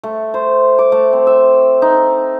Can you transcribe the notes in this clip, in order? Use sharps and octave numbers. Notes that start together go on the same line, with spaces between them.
A3
C5
D6
A3
C4
E5
D#4